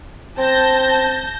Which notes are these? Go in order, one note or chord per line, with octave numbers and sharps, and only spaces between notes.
C4 A5 G6 A#6